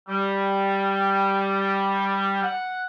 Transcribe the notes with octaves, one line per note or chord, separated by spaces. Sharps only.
G3
F#5